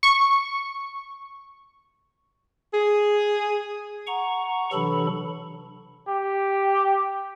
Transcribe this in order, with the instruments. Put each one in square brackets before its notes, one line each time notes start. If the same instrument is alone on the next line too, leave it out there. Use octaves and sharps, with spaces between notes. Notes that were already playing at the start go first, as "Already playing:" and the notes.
[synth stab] C#6
[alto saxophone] G#4
[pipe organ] F#5 A#5 C#6
C3 E3 F#3 D4 A4 B5
[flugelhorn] G4